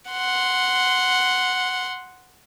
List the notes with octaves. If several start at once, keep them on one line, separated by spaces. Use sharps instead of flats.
F#5 C6